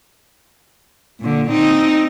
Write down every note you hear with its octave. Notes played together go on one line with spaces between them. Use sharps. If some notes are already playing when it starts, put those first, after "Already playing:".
A#2 D3
C4 D#4